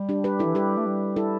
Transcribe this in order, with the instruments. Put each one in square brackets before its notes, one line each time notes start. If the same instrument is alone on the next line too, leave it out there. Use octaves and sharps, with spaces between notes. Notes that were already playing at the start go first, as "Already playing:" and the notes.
Already playing: [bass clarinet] G3
[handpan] D4 G4
G4 B4
[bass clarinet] E3 [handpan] E4 A4
[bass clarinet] G3 [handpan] G4 B4
[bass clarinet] A3
G3
[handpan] E4 A4